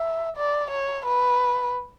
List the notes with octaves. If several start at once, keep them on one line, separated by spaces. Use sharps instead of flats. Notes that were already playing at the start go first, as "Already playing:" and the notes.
Already playing: E5
D5
C#5
B4